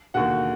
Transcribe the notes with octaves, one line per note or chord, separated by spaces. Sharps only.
E1 D#2 D3 F#4 F#5